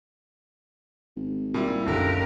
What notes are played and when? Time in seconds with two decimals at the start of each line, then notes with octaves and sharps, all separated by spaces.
1.17 G#1
1.54 A#2 G3 E4
1.87 F#1 F#2 D3 D#3 G4 A#4